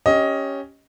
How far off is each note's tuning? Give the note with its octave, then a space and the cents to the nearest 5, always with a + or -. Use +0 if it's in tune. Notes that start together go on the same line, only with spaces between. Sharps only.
C#4 +0 G4 +0 D#5 +15